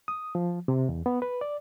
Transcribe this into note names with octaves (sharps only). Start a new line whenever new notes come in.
D#6
F3
C3
E2
B3
B4
D5